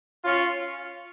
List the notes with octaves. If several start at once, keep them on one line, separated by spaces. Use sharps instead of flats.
C#4 F4